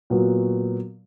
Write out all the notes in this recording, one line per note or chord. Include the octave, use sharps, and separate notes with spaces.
A#2 F#3 B3 F#4